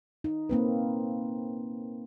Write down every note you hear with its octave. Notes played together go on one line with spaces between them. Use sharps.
D#4
A#3 C4 B4